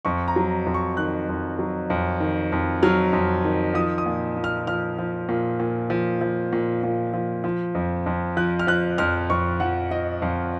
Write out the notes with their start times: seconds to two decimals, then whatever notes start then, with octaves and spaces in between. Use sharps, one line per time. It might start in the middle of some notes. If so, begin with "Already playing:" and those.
0.05 F2 C#6
0.28 A#5
0.36 F#3
0.66 F2
0.74 C#6
0.97 D#3 F#6
1.29 F2
1.59 F#3
1.90 F2
2.20 D#3
2.52 F2
2.83 F#3 F6
3.13 F2
3.44 D#3
3.74 F3 D#6
3.98 D#6
4.06 A#2
4.37 A#2
4.44 F6
4.67 F3 F6
4.99 F3
5.29 A#2
5.60 A#2
5.90 F3
6.21 F3
6.53 A#2
6.83 A#2
7.14 F3
7.44 F3
7.75 F2
8.06 F2
8.37 F3 F#6
8.59 F6
8.67 F3 F#6
8.98 F2 F6
9.30 F2 C#6
9.60 F3 F#5
9.91 F3 D#5
10.22 F2 F5